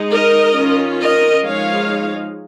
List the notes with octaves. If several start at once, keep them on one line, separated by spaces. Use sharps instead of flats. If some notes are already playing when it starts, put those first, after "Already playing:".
Already playing: G#3 D#4
A#4 D#5
D#3 C#4 F4
A#4 D#5
F3 G#3 D#4 C#5 F5